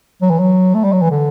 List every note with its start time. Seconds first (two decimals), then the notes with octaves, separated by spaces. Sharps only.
0.22 F#3
0.30 E3
0.39 F#3
0.74 A3
0.84 G3
0.93 F#3
1.02 E3
1.11 D3